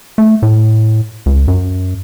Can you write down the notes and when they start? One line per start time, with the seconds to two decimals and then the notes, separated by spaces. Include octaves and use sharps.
0.18 A3
0.42 A2
1.26 C#2
1.48 F#2